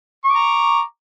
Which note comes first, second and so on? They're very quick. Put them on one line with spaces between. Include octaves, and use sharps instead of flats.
C#6 D6 A#5